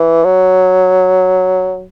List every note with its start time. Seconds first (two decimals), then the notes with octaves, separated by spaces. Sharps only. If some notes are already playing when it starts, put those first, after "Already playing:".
Already playing: E3
0.24 F#3